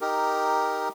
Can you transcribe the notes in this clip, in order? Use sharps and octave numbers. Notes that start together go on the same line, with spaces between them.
D#4 G4 A#4